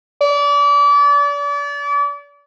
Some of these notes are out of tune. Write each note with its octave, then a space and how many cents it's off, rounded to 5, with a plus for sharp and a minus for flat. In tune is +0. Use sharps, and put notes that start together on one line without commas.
D5 -35